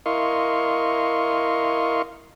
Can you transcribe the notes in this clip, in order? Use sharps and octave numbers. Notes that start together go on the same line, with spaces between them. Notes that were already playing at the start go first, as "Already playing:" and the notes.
E4 A#4 D#5 F5 C6 C#6